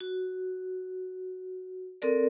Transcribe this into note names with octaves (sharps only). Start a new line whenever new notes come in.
F#4
C4 A4 A#4 D5